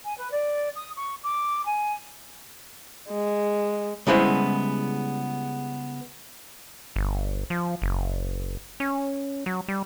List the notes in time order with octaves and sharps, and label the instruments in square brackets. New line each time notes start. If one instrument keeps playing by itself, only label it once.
[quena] G#5
B4
D5
D#6
C#6
D6
G#5
[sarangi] G#3
[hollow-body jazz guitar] C#3 G3 G#3 B3 E4 C5
[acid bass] G1
F3
F#1
C#4
F#3
G3